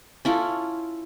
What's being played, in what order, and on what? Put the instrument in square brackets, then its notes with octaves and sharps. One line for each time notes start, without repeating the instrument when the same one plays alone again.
[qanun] C#4 E4 F4 A4